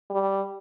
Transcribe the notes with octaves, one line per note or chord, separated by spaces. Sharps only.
G3